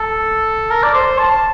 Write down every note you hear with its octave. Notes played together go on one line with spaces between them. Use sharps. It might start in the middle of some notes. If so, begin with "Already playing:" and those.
Already playing: A4
A#4
D5
C5
A5